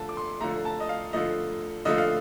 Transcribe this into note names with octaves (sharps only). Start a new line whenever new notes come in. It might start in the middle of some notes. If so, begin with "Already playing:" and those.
Already playing: D3 F3 A3 A5
D6
C6
D3 F3 A3 A#5
A5
D#5
F5
D3 F3 A3 D#5
D3 F3 A3 D#5
F5